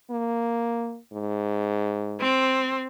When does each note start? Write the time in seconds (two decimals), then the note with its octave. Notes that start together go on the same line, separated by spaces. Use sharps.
0.11 A#3
1.13 G#2
2.21 C4